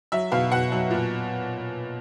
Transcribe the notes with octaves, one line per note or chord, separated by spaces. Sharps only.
F#3 E5
B2 F5
B2 F#5
F#3
A#2